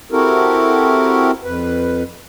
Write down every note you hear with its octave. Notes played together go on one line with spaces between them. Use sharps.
C4 E4 F#4 G4 A4 A#4
F2 B4